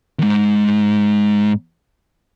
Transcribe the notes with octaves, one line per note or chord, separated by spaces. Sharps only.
D#2 G#2